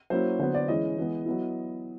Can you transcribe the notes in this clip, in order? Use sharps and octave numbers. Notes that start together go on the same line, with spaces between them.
F#3 A#3 C#4 E4 C5
D3 F#3 B3 C5
D5
E3 G#3 C#4 E4 D#5
E3 G#3 B3
F#3 B3 E4